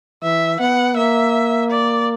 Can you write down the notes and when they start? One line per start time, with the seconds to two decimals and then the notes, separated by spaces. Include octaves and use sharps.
0.23 E3 E5
0.60 B3 F#5
0.96 A#3 E5
1.70 D5